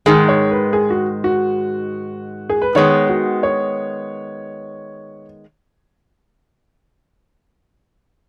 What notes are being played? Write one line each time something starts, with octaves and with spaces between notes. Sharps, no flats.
G#2 D#3 G#3 G#4
C#5
B4
G#4
F#4
F#4
G#4
B4
D#3 G#3 B3 C#5
F#4
C#5